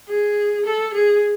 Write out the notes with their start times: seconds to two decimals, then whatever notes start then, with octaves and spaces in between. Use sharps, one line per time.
0.08 G#4
0.65 A4
0.94 G#4